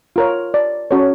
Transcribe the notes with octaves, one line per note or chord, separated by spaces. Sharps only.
F4 A#4 C#5
D5
C#4 F#4 A4 C#5